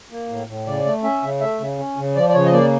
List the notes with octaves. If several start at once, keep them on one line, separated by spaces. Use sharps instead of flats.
A#3
A2
A2
C#3 D5
A3
C#4 E5
C#3
A3 E5
C#3
C#4
C#3
F3 D5
D5
C#3 C#5
D#5
A#3 D5